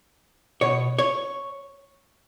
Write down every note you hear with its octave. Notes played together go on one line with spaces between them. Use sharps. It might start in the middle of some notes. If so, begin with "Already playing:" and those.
B2 C#5
C#5